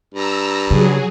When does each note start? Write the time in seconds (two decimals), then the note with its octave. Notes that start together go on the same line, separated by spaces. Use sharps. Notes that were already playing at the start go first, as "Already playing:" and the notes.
0.14 G2 A#5 E6
0.70 C#3 F#3 G#4